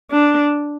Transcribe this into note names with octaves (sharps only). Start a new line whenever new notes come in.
D4